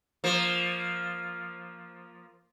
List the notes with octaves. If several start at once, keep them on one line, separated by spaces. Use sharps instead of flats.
F3 A#3